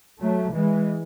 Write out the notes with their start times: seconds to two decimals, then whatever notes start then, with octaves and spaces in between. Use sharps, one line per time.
0.21 F#3 A3
0.54 E3 G#3